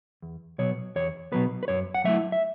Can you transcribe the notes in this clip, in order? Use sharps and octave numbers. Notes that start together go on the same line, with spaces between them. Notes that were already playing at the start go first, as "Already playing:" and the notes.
E2
B2 F#3 B3 C#5
E2 C#5
B2 F#3 B3 B4
B4
F#2 C#5
F#5
F#3 A3 E4 E5
E5